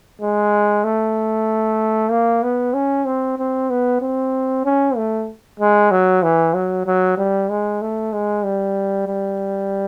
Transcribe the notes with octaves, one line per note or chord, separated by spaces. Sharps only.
G#3
A3
A#3
B3
C#4
C4
C4
B3
C4
C#4
A3
G#3
F#3
E3
F#3
F#3
G3
G#3
A3
G#3
G3
G3